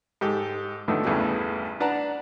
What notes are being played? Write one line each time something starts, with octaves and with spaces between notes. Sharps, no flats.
G#2 G4 A4
A2 D3 D#3 F3 A3 B3
A1 E2 G2 C#3 E3 A3
D4 B4 F#5 A5 A#5